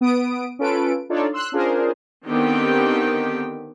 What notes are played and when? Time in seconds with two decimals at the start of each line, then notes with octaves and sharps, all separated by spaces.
0.01 B3 D#6 D7
0.59 C#4 F4 A4 B4 D7
1.09 D4 D#4 F4 A4 C#5 D5
1.33 C6 E6 F#6
1.52 C#4 D4 F4 G#4 A#4 C5
2.26 D3 D#3 B3 C4 G4 G5